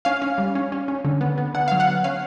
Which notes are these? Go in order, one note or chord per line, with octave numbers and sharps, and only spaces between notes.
C#4 F5
C#4
G3
C#4
C#4
C#4
D3
B3
B3
D3 F#5
F#3 F5
F#5
B3
C#4 F5